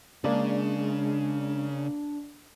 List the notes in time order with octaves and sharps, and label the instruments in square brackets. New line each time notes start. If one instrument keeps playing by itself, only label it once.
[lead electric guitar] C#3 [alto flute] G#3 [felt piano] A#3 D5 [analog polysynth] D4